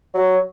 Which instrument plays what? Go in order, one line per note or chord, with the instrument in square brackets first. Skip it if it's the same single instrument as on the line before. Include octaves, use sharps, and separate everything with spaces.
[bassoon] F#3